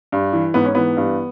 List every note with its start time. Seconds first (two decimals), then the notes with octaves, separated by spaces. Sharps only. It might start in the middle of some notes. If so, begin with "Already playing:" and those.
0.12 G2
0.33 E3
0.54 G#2 B3
0.65 C#4
0.75 E3 B3
0.97 G2